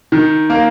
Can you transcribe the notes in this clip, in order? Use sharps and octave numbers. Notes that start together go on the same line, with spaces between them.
D#3
A#3